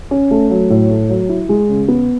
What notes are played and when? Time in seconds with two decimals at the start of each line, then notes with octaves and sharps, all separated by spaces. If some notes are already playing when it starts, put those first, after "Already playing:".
0.11 C#4
0.31 A3
0.50 F#3
0.70 A2
0.90 A3
1.09 F#3
1.29 E4
1.49 G#3
1.69 C#3
1.88 B3